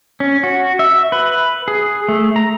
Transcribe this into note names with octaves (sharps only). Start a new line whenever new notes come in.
C#4
F#4
E5
B4
G#4
A3
A#5